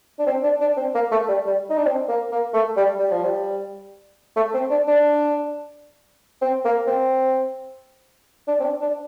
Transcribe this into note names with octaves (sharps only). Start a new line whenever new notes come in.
D4
C4
D4
D4
C4
A#3
A3
G3
G3
D#4
D4
C4
A#3
A#3
A3
G3
G3
F3
G3
A3
C4
D4
D4
C4
A#3
C4
D4
C4
D4
D4